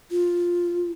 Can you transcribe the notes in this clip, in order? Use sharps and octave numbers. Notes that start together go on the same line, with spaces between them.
F4